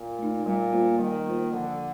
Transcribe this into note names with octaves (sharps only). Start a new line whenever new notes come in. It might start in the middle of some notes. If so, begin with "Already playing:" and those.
Already playing: A#2
A3 D#4
A#2 G3
A#3 F4 C5
D#3 G3
A#3 F4 C5
D3 F3